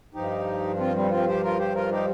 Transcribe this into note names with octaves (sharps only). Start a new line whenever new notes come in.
G2 F3 D#4 G4
C4 F4
G3 C4
C4 F4
G4 C5
F4 A#4
G4 C5
F4 A#4
D#4 G4